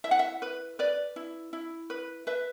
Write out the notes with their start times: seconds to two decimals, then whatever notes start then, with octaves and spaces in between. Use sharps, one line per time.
0.04 E4 E5
0.11 F#5
0.19 E5
0.42 B4
0.79 B4 D5
1.16 E4
1.53 E4
1.90 B4
2.27 B4 E5